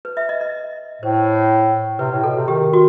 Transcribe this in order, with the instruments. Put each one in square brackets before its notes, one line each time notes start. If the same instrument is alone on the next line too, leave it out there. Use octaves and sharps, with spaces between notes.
[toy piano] B4
E5
D#5
D#5
[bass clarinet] A2 [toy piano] C5
[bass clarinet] C3 [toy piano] B4
[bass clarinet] A2
[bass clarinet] B2 [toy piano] A4
[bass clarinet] C3
[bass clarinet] D#3 [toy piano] G4
[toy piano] F#4